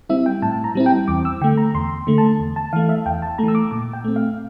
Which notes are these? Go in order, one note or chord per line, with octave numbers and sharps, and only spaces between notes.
G3 C4 E4 E5
G5
A2 A5
A#5
G3 C4 E4
G5
E2 D6
E6
D3 A3 G5
A#5
E2 C6
D3 A3
A5
E2
A5
E3 A3 F5
E5
E2 G5
A5
E3 A3 A#5
E6
D6
A#2 D6
G5
A3 C4
F5